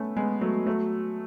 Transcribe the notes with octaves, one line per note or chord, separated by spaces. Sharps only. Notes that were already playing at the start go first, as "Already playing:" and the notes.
Already playing: A3 B3 C#4
G#3 B3
F#3 A3
F#3 A3